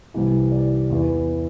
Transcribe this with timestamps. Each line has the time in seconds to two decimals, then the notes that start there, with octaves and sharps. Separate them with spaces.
0.14 C2 C3 E3
0.52 D5
0.90 E2 E3